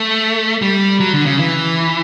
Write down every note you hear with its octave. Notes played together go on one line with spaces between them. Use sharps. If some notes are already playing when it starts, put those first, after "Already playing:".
Already playing: A3
G3
F#3
D3
C#3
E3